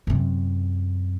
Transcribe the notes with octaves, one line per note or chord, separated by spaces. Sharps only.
F#2 C3